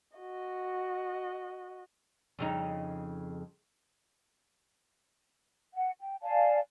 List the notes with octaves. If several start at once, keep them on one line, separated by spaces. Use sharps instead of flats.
F#4 D#5
F2 C#3 D#4
F#5
G5
D5 F5 G#5 A5